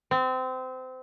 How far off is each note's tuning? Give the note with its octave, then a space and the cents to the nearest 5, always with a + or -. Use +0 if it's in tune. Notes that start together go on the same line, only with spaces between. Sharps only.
C4 -25